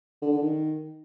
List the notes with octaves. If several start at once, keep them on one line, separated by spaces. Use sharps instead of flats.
D3
D3
D#3